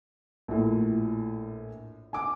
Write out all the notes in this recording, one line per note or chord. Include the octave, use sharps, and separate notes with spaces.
A#1 A2
G#5 D6